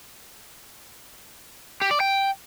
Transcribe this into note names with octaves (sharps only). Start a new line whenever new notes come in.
G4
D5
G5